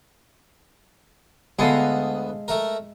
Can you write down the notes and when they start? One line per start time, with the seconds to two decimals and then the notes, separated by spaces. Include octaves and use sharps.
1.59 D2 G#3 B3 A4 D#5 F5
2.48 A3 A#4